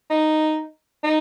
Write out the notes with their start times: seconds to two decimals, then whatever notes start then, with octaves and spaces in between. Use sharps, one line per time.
0.10 D#4
1.03 D#4